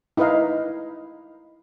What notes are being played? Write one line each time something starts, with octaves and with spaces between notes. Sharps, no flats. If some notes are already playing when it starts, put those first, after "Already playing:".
D#4 E4 B4 D#5 F5